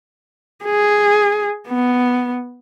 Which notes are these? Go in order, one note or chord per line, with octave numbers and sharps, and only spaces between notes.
G#4
B3